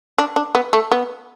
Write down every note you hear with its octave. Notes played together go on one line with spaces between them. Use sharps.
D4
D4
B3
A3
B3